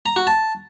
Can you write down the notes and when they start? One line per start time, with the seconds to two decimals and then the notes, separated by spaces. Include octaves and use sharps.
0.06 A#5
0.16 F#4
0.27 A5